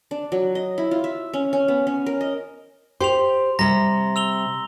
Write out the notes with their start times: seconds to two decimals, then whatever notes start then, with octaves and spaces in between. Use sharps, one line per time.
0.11 D4
0.32 F#3
0.55 D#5
0.78 E4
0.91 F4
1.04 E5
1.33 C#4
1.53 C#4
1.68 B3
1.87 C#4
2.06 A#4
2.21 D#5
3.01 G4 C5 C6 F7
3.59 C3 G3 A#5 A#6
4.16 E6 F7 G7